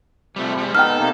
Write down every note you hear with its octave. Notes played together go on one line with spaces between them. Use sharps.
C3 F3 G3 A3
G3 G#3
B3 D#4 A4 G5 F6
C3 A#3 D#4